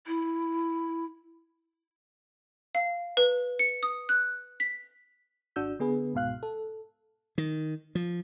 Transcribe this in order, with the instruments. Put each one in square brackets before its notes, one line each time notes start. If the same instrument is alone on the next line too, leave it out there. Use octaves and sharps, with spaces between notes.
[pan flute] E4
[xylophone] F5
B4
C#7
D#6
F#6
B6
[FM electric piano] G#1 D4 F#4 E6 G6
D3 B3 G#4 B4
C#2 G#2 B2 F5 F#6
A4
[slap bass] D#3
F3